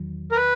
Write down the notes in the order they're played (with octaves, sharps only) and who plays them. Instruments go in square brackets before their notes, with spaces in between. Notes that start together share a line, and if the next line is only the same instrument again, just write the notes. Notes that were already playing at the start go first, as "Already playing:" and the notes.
Already playing: [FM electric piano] E2 D#3 F#3
[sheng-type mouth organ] A#4
B4